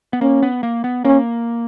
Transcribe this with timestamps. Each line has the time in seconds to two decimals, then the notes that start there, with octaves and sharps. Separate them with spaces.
0.13 B3
0.21 A#3 C#4
0.42 B3
0.63 A#3
0.84 B3
1.04 A#3 C#4